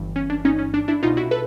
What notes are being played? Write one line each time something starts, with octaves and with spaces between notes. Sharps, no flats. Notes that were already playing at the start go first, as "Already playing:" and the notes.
Already playing: G1 G2 E3
C#4
D4
C#4 D#4
C#4
D4
D4 E4
C2 B2 D#4 F4
E4 F#4
A4 B4